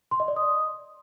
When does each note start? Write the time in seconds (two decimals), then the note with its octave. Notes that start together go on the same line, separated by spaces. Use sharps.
0.11 C6
0.20 D#5
0.28 D5
0.36 D#6